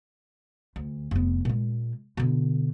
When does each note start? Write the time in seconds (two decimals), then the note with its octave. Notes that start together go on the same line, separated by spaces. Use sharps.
0.76 D2
1.11 F1 B3
1.45 A#2 G#3
2.17 B2 D3